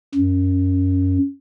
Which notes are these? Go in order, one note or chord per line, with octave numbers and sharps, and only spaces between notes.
F#2